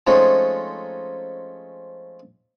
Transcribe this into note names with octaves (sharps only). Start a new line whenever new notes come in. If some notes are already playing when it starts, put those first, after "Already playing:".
F3 G#3 A3 C4 C#4 D#4